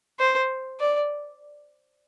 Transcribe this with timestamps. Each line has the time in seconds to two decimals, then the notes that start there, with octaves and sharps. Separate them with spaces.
0.19 C5
0.80 D5